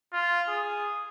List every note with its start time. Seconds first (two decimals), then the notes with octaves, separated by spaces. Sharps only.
0.12 F4
0.48 G#4